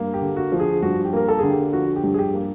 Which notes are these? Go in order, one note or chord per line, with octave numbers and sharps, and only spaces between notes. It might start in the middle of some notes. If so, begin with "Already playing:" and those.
Already playing: G2 A#3
G4
D3
F#4
F3
G#4
G2 F#4
G4
A#3 A#4
A4
D3 G#4
G4
F3 F#4
G4
G2
G#4
G4
A#3